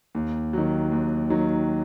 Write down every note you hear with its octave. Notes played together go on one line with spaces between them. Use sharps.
D#2
D#3 F#3
D#2
D#3 F#3